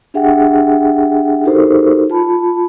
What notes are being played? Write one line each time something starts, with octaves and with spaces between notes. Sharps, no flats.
D4 G4 G#4 E5 F#5 G5
D#4 F#4 G4 A4 A#4 C5
F4 A5 B5